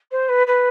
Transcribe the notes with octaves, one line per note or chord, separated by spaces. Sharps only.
C5
B4
B4